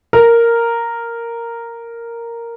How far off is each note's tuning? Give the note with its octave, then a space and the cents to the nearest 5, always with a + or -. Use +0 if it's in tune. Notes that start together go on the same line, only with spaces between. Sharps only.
A#4 -5